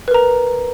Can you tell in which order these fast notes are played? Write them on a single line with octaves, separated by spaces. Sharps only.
B4 A#4 A#5